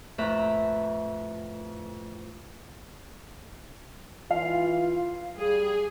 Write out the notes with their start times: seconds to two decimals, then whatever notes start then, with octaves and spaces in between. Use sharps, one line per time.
0.18 F2 A2 B4 E5 A#5
4.31 E3 F4 F5
5.38 G3 G#4